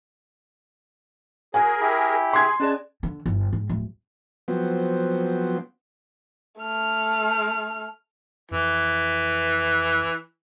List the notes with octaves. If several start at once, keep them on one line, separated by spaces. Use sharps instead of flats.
F#4 G#4 A#4 C#5 F5 G#5
E4 G4 B5
G#4 C6 G#6
C#4 G#4 D5 D#5 A5 F#6
D3
G1
G#2
D1
F3 F#3 B3 C4
A3 F6
F2 E3